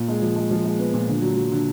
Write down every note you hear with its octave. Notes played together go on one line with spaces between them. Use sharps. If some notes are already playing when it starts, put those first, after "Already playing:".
Already playing: A#2
G#3
F3
G#3
F3
G#3
B3
A#2
D3
F#3
F#3
D3